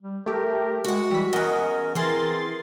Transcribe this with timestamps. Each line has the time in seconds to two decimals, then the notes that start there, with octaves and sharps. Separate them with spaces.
0.02 G3
0.26 A3 G4 A#4
0.84 G#3 F#4 F#5
1.11 E3 G3 B6
1.33 E2 C#4 A#4 D#5 F#5
1.95 E3 C4 G#4 A#4 C6 A6